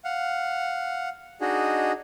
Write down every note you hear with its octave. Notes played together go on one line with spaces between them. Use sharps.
F5 F#5
D4 D#4 F#4 G#4 D#5